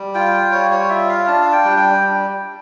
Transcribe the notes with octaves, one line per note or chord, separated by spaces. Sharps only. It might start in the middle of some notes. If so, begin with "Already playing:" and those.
Already playing: G3
F4 G5
G3 C#5
C#5
F4 E5
F5
D4 A5
F5
G5
G3
G5